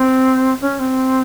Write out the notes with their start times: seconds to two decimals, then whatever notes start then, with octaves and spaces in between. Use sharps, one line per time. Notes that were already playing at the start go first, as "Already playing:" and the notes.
Already playing: C4
0.61 C#4
0.79 C4